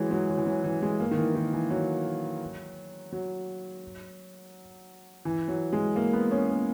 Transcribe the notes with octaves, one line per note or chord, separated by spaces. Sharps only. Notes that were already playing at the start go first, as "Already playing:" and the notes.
Already playing: E3 F#3 G#3
F#3
F#3
E3
F#3
E3
G#3
A#3
D#3
E3
D#3
E3
F#3
F#3
E3
F#3
G#3
A#3
B3
C#4
A#3